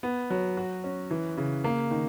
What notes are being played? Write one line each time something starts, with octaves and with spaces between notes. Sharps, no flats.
B3
F#3
F#4
C#4
E3
C#3
A#3
D#3